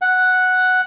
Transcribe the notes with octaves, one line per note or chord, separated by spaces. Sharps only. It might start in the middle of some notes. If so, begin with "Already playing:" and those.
F#5